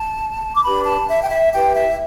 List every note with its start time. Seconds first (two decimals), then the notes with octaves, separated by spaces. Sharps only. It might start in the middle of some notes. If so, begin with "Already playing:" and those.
Already playing: A5
0.55 D6
0.64 D4 G4 B4 B5
0.86 A5
1.09 E5
1.23 G5
1.30 E5
1.52 E4 G4 B4 G5
1.74 E5